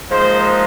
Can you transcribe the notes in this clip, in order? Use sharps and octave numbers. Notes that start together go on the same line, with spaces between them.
A#2 F3 G#3 D#4 C5